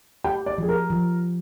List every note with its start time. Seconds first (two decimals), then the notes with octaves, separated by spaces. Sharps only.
0.24 G4 G5
0.46 D5
0.58 F3 G#4
0.69 A#4
0.90 F3